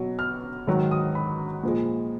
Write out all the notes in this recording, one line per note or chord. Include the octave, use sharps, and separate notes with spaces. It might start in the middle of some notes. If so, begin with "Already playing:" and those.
Already playing: B2 F#3
F6
G#2 D#3 F#3
D#6
B5
A#2 F3 G#3